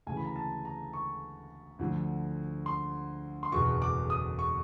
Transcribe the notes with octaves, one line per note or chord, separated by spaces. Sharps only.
D2 C#3 E3 G#5
B5
A#5
A5
A#5
C#6
D2 D3 F3
C6
C6
F#1 E2 B2 C#6
D6
D#6
C#6